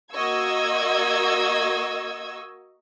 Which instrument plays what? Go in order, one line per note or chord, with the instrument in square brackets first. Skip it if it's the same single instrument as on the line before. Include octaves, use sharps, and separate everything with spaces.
[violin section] A#3 F#4 D#5 C#6 E6 G#6